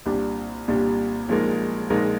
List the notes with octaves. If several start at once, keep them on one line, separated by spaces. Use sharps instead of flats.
C2 A#2 G3 D4 G4
C2 A#2 G3 D4 G4
A#1 A#2 G#3 D#4 A#4
A#1 A#2 G#3 D#4 A#4